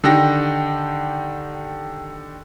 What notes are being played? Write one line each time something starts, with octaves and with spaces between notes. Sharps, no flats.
D3 D#3 G4 A#6